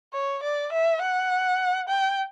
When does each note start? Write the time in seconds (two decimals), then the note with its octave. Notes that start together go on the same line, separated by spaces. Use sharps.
0.13 C#5
0.43 D5
0.72 E5
1.02 F#5
1.89 G5